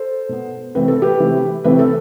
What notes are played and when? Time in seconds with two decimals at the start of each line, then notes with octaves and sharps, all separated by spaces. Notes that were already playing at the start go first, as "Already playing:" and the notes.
Already playing: A4 C5
0.29 B2 B3
0.75 C3 E3 A3 C4 B4
0.88 A4
1.02 G4 B4
1.20 C3 E3 A3 C4
1.64 C3 E3 A3 C4 B4
1.79 A4